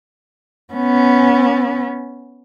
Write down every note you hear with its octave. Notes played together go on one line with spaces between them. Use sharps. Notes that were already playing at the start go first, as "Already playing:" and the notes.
B3 C#4